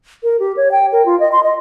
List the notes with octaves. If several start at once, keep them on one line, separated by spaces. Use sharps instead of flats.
A#4
G4
C#5
G5
A#4
F4
D#5
C6
D#5